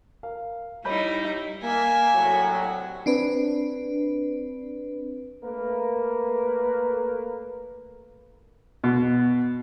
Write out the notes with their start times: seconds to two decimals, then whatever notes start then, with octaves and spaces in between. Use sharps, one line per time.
0.23 A#4 F5
0.85 G3 D#4 E4 C#5 B5 G6
1.63 A#3 E5 G#5
2.15 C2 A2 F#3
3.06 C4 D4 B4
5.43 A3 A#3 A#4 B4
8.84 B2